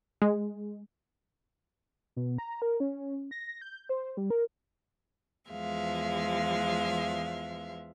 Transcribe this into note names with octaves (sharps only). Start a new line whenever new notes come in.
G#3
B2
A#5
A#4
C#4
A#6
G6
C5
G3
A#4
E2 F3 G#3 E5 F5